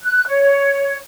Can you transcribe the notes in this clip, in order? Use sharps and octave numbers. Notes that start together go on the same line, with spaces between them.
F#6
C#5